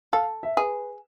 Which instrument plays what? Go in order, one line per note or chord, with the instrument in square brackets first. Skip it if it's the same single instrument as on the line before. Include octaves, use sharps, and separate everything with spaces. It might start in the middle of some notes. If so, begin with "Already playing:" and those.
[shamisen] A4 [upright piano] F5
[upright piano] E5
[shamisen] G#4 [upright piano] B4